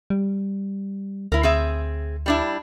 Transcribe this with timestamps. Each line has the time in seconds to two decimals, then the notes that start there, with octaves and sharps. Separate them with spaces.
0.10 G3
1.32 D2 E4 A#4
1.43 C4 G#4 E5
2.26 G3 D4 E4